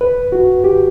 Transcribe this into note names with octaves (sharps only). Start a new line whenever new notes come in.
B4
F#4
G4